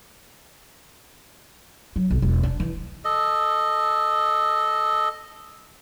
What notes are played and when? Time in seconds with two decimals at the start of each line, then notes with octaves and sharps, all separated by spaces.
1.96 F#3
2.11 B1
2.22 E1
2.43 D4
2.60 E3
3.05 A4 D#5